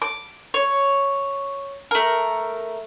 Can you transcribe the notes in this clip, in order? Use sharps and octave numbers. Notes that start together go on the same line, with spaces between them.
D6
C#5
A3 A#4